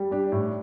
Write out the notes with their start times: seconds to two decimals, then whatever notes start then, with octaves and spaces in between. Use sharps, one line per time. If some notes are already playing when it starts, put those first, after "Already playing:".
Already playing: G3
0.11 D4 G4
0.32 A2